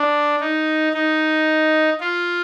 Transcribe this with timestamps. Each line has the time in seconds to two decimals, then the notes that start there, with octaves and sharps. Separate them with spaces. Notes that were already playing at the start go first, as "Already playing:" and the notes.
Already playing: D4
0.40 D#4
0.94 D#4
2.00 F4